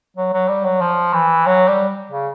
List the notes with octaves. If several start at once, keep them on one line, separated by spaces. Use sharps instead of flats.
F#3
F#3
G3
F#3
F3
E3
F#3
G3
C#3